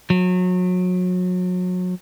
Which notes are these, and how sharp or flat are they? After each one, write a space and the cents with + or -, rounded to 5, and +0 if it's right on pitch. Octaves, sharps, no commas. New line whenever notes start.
F#3 -30